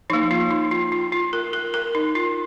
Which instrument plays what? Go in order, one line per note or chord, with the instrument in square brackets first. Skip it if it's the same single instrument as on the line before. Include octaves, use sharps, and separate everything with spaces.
[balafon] F3 D#4
A#3
F4
D#4
F4
F4
F4
A#4
A#4
A#4
D#4
F4